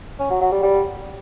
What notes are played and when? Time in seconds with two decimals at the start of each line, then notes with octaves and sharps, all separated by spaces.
0.19 C#4
0.30 F#3
0.41 F#3
0.52 G3
0.63 G3